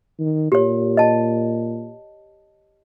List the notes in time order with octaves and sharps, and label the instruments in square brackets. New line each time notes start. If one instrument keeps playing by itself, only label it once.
[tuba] D#3
[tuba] A#2 [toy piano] G4 C#5
[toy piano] D#5 A5